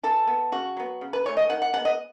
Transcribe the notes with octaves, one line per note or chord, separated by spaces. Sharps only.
E3 A4
B3
C#3 F#4
F#3 B3
C#3
B4
E3 A3 C#5
D#5
D#3 F#5
F#5
G#3 B3 F#5
D#5